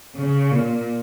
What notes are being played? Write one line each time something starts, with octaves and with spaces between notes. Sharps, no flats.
C#3
A#2